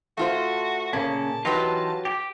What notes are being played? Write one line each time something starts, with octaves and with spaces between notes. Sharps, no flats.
A3 F4 F#4 C5
A#2 C#3 A#3 C#4 A5
E3 F#3 D#4 F4 G4 B4
G4